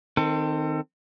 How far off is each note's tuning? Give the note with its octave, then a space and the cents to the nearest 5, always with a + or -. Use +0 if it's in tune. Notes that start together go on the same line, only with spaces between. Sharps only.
D#3 +0 C4 +0 A4 +30